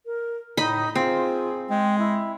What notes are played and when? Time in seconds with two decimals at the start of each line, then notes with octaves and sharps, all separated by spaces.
0.06 A#4
0.57 A2 D#4 D#5 B5
0.95 C4 F4 G#4
1.69 G#3 G5
1.99 E4